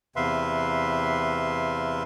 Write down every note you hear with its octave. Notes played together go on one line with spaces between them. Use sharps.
E2 C3 B4 E5 F5 C6